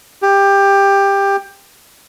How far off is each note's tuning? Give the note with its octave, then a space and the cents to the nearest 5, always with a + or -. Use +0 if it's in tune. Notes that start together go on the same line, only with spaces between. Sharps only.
G4 +15